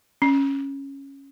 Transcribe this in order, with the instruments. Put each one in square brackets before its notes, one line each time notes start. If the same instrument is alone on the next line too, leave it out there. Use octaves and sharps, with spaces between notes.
[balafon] C#4